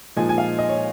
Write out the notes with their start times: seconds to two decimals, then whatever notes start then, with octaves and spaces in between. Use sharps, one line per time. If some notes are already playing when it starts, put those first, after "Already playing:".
0.16 A#2 F3 G#3 D#4 G#5
0.29 G#5
0.38 F5
0.59 D#5
0.69 C#5